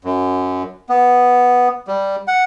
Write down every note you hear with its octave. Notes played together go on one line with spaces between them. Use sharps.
F#2
B3
G3
F#5